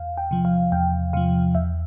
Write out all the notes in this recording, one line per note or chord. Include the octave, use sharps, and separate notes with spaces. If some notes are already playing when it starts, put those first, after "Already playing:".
Already playing: E2 F5
G5
C3 F3
F5
E2 G5
C3 F3 F5
E2 E5